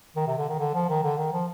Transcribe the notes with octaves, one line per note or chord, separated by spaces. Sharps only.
D#3
C3
D3
D#3
D3
F3
D#3
D3
D#3
F3